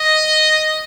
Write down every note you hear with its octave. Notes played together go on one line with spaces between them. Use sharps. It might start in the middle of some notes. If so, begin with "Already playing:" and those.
Already playing: D#5